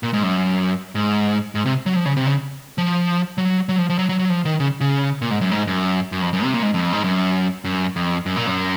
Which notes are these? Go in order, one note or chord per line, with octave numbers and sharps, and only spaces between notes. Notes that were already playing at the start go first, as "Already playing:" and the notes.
A#2
G#2
F#2
G#2
G#2
C3
F#3
F3
C#3
C3
C#3
F3
F#3
F#3
F3
F3
F#3
F#3
F#3
F3
D#3
C#3
C#3
A#2
G#2
F#2
G#2
F#2
F#2
F2
F#2
C3
A#2
G#2
F2
G#2
F#2
F#2
F2
F#2
A#2
F#2